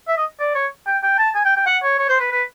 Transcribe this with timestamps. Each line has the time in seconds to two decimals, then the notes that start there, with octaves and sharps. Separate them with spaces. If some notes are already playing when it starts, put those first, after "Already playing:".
0.08 E5
0.17 D#5
0.40 D5
0.55 C#5
0.87 G5
1.03 G5
1.18 A5
1.35 G#5
1.45 G5
1.57 G5
1.66 F#5
1.83 C#5
1.99 C#5
2.09 C5
2.20 B4
2.31 B4